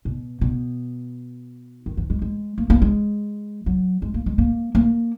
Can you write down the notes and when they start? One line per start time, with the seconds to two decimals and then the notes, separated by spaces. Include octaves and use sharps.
0.05 B2
0.41 B2
1.86 D#3
1.97 E3
2.10 G#3
2.22 G#3
2.58 A#3
2.70 A#3
2.82 G#3
3.66 F#3
4.02 G#3
4.14 A#3
4.26 G#3
4.38 A#3
4.75 A#3